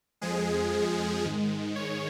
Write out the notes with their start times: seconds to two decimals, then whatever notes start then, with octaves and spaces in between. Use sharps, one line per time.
0.21 F2 F3 G#3 G#4
1.24 G#2 D#3 G#3
1.76 C#5